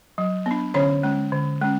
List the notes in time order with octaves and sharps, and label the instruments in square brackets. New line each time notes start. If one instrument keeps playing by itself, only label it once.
[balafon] F#3
B3
D4
D3 C#4 C#5
G#3 C#4
D3
G#3 C#4